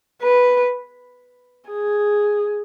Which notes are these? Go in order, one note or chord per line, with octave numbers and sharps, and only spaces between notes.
B4
G#4